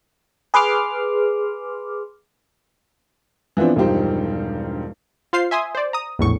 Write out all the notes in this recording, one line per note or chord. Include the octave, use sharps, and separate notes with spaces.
G#4 B4 C6 D6 F6
E3 F3 B3 C4 D4
E1 G2 F3 D#4 G4 C5
F4 C5 F5 C6 C7
E5 G#5 C6 D#6
C5 D5
A#5 D#6
A#1 E2 A2 C#6